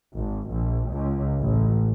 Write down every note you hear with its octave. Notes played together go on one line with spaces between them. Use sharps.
G#1
A#1
C#2
A1